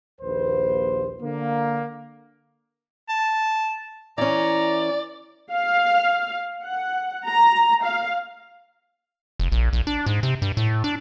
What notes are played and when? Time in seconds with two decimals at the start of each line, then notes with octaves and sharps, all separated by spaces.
0.21 A#1 D#2 B4 C5
1.21 D3 A#3
3.09 A5
4.18 E3 C#4 D5 A#5
5.51 F5
6.65 F#5
7.27 A#5
7.84 F5
9.40 F1
9.52 A#1
9.73 A#1
9.87 D4
10.06 G#2
10.23 C3
10.42 G2
10.57 A2
10.84 D4